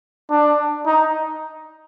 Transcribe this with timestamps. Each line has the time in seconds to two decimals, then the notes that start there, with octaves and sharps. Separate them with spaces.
0.30 D4
0.86 D#4